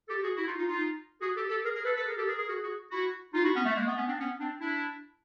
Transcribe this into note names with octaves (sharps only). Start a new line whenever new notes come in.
G4 A4
F#4 G#4
E4 F#4
D#4 F4
D#4 F4
D#4 F4
F#4 G#4
G4 A4
G4 A4
G#4 A#4
G#4 A#4
A4 B4
A4 B4
G#4 A#4
G4 A4
G#4 A#4
G#4 A#4
F#4 G#4
F#4 G#4
E4 F#4
D#4 F4
E4 F#4
B3 C#4
A3
G#3 A#3
A3 B3
B3 C#4
C4 D4
B3 C#4
C4 D4
D4 E4